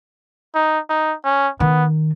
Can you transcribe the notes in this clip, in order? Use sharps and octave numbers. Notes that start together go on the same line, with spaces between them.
D#4
D#4
C#4
D#3 B3